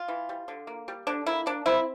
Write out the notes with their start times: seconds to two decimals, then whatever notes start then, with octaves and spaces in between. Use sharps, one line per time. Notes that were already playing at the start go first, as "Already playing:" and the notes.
Already playing: F4
0.08 E3
0.29 G3
0.48 D3
0.67 A#3
0.88 G3
1.07 D3 D4
1.26 A#3 E4
1.46 A#3 D4
1.66 C4 E4